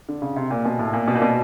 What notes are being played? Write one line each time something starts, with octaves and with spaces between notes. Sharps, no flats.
D3
C#3
C3
A#2
B2
A2
A#2
B2
A#2
B2